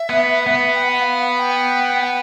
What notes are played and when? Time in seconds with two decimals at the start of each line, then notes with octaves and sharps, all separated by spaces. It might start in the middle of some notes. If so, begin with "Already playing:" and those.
Already playing: E5
0.10 B3
0.47 B3
0.75 G5
0.83 F#5
1.02 F5
1.21 F#5
1.39 G5